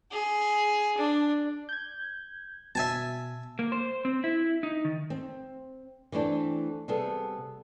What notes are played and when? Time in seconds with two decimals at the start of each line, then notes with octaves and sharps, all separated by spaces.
0.12 G#4
0.97 D4
1.69 G6 G#6
2.75 B2 E5 G#5 A5
3.59 A#3
3.72 C5
4.05 C4
4.24 E4
4.63 D#4
4.85 D#3
5.10 C4
6.12 E3 A3 C4 D4
6.88 C3 G3 B3 G#4 A4